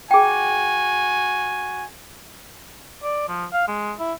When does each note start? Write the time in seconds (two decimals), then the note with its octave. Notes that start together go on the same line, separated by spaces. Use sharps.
0.11 F#4 G#4 G5 G#5
3.03 D5
3.28 F3
3.53 F5
3.68 G#3
3.99 E4